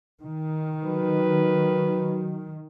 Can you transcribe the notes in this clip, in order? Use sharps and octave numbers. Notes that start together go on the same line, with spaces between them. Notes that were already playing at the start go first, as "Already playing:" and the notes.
D#3
F#3 B4